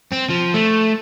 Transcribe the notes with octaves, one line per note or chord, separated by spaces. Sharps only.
C4
F3
A3